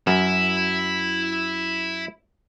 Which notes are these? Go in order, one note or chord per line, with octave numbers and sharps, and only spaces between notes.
F#2 E4